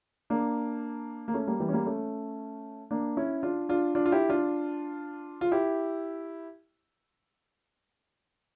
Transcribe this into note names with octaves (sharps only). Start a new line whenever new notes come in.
A#3 D4
A#3
A3 C#4
G3 A#3
E3 G3
C#4
G3 A#3
A3 C#4
A#3 D4
C#4 E4
D4 F4
D4 F4
D4 F4
F4
E4 G4
D4 F4
F4
E4 G4